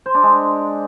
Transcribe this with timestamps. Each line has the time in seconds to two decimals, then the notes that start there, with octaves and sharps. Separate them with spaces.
0.06 C5
0.14 D4
0.23 G#3